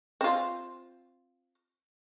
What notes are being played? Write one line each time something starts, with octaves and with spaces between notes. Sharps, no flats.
C4 F4